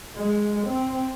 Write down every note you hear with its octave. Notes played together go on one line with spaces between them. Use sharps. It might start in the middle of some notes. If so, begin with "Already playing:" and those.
G#3
C4